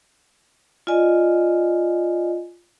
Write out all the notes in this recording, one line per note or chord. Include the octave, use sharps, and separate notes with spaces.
F4 D5 D#5 G#5